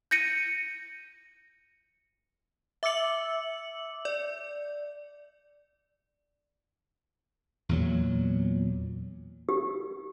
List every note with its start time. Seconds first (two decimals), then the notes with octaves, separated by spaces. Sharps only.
0.11 G6 A#6 C#7 D#7
2.83 E5 D6 E6 C#7 F#7
4.05 D5
7.69 E2 A#2 F#3
9.49 G4